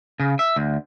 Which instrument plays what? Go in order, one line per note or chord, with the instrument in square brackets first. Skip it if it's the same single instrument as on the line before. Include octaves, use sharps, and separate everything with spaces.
[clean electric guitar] C#3
E5
D2